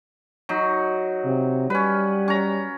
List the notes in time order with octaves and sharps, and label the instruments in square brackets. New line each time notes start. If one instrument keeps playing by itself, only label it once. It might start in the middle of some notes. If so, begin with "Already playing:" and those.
[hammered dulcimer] F#3 D#4
[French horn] C3
[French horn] G3 [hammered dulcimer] C#4 B4
[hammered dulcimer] C#4 A#5